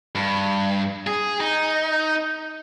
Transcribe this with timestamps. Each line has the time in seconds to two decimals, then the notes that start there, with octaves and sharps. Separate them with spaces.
0.15 G2
1.07 G#4
1.40 D#4